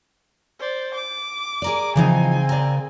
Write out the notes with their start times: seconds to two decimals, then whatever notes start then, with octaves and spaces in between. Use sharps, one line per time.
0.59 C5 D5
0.94 D6
1.62 G#4 A#4 D5
1.96 C#3 E3 F3 C4 D#4 G#5
2.49 A#4 D5